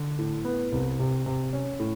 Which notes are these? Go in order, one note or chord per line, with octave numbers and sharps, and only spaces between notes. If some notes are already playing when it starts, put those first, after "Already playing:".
Already playing: D3
A2
B3
C2
C3
C3
C#4
A2